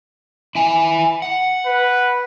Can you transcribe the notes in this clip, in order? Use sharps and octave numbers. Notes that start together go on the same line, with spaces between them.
E4 G#5
F#5
B4